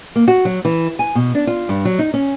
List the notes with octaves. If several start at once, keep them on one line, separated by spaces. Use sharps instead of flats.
A#3
F#4
F#3
E3
G#5
B2
D4
F4
G2
F#3
D#4
C#4